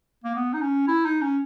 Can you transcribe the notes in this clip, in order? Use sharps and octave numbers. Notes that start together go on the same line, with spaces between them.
A#3
B3
D#4
C#4
E4
D#4
C#4